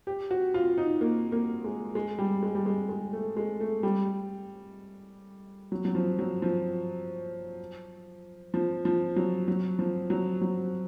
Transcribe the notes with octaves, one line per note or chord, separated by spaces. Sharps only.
G4
F#4
F4
D#4
A#3
A#3
G#3
G#3
G3
G#3
G3
G#3
G#3
A3
G#3
A3
G3
F#3
F#3
F3
F#3
F3
F3
F3
F#3
F#3
F3
F#3
F#3